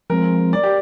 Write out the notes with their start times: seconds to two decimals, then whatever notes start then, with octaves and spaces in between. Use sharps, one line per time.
0.10 F3 G#3 C4 A#4
0.53 D5
0.64 G4